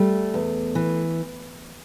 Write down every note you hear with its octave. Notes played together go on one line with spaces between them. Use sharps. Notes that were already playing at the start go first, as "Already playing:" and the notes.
Already playing: G3 A3
E2
E3